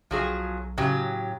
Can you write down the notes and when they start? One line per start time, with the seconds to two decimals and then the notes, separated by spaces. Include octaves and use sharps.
0.11 B1 F3 F#3 G#4
0.78 A2 C#3 F#3 G4